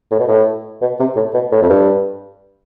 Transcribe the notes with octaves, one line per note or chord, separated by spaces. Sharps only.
A2
B2
A2
B2
C3
A2
B2
A2
F2
G2